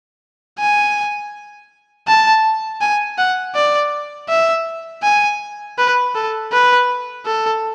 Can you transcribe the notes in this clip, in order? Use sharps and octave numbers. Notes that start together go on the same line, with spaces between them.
G#5
A5
G#5
F#5
D5
E5
G#5
B4
A4
B4
A4